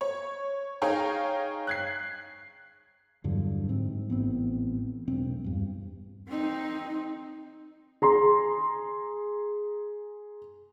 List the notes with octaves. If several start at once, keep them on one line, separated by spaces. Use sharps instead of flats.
C#5
D#4 G#4 C#5 F5 G5 A#5
F#6 G#6 C7
E2 G2 D3 F#3
G#2 C4
A1 B3 C4
E1 B1 C4
E2 G2
C4 D#4
G#4 A#5 C6